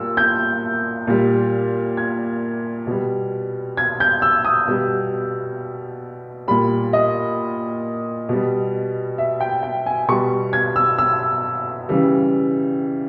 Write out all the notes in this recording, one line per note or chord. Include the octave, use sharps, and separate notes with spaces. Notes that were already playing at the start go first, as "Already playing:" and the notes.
Already playing: A#2 G3 E6
G6
A#2 G3
G#6
B2 G3
G#6
G6
E6
D#6
B2 G3
A#2 G3 B5
D#5
B2 G3
E5
G5
G5
G#5
B2 G3 C#6
G#6
E6
E6
C#3 E3 G3